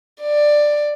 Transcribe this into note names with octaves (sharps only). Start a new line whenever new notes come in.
D5